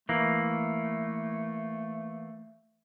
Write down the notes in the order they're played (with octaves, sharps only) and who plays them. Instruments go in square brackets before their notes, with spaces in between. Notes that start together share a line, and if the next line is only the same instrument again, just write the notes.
[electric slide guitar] E3 A#3 [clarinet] A3